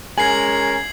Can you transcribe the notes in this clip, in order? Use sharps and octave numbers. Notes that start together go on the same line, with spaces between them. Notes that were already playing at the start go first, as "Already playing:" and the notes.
G#3 C#4 A#4 G#5 G#6 C7 F#7